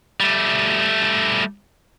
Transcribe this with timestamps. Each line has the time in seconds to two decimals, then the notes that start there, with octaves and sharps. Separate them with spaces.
0.20 G3 A3